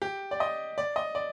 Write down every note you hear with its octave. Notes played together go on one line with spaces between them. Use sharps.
G4
D5
D#5
D5
D#5
D5